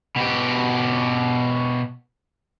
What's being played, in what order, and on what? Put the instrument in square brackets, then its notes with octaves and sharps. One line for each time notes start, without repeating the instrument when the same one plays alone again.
[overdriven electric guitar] B2 G4